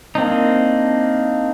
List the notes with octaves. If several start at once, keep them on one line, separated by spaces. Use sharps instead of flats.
A#3 C4 D4 D#4